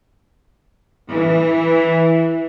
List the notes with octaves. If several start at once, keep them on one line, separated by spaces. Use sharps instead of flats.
E3